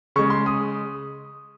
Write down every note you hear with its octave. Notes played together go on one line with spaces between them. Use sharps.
C#3 G#3 C#6
C6
D#6